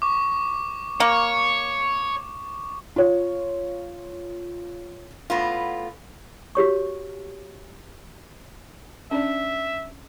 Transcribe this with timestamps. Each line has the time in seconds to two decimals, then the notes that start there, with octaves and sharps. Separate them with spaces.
0.02 C#6 D6
1.00 A#3 C#5
2.96 F4 C#5
5.30 A2 B3 F4
6.55 F#4 G4 C#5 C#6
9.11 C#4 D4 D5 E5